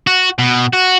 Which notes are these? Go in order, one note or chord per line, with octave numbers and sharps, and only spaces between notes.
F#4
B2
F#4